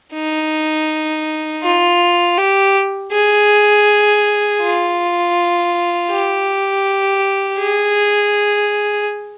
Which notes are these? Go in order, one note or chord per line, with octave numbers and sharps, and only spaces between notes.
D#4
F4
G4
G#4
F4
G4
G#4